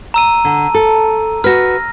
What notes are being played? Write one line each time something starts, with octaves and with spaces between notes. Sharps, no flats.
A#5 E6 D#7
D3
A4
F#4 B4 F6 A#6